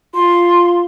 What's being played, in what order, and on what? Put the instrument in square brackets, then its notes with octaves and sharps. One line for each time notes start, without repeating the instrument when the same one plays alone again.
[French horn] F4 [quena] C6